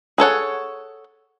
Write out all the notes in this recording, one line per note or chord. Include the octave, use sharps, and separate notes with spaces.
G#4 A4 C#5 F#5